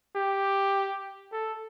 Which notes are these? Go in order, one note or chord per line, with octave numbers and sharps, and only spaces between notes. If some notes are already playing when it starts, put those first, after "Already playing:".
G4
A4